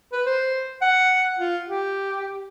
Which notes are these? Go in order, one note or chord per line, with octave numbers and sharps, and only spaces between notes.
B4
C5
F#5
F4
G4